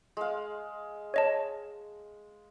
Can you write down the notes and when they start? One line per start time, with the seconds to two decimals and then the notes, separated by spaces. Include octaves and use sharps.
0.17 G#3 F5
1.14 C#5 D#5 A5